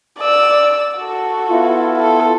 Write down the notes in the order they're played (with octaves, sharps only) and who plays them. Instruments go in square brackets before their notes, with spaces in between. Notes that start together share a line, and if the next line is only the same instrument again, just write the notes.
[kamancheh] D5 E6
F#4 A4
[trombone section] B3 E4 F4
[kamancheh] A4